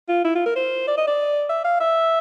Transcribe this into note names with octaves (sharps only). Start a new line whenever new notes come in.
F4
E4
F4
A#4
C5
D5
D#5
D5
E5
F5
E5